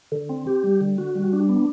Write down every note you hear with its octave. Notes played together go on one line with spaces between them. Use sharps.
D3
C4
G4
G3
D3
F#4
G3
D4
B3